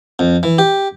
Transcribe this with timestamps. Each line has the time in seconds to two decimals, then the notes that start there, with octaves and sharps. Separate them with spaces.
0.19 F2
0.43 E3
0.58 G4